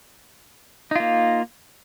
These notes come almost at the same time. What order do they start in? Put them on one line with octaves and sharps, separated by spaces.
D#4 F4 A#3